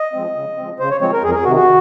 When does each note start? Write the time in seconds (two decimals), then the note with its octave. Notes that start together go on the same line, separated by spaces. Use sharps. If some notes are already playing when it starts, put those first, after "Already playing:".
Already playing: D#5
0.13 F3 G#3 C4
0.36 C#3
0.57 F3 G#3 C4
0.79 C#3 C5
0.90 C#5
1.01 F3 G#3 C4 C#5
1.13 A#4
1.23 F2 G#4
1.30 A#4
1.35 G#4
1.45 C3 D#3 F#4
1.56 F#4